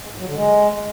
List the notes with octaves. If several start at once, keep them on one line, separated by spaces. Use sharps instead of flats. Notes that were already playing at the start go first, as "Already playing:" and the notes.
G#3
G#2
F#3
D3
G#3